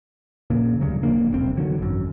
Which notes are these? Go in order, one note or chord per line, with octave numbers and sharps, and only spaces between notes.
F2 A#2 C#3 A#3
D2 G2 C#3 F#3
D1 F2 A#3 D4
E1 C2 C4
D3 D#3 F#3
G#1 F#2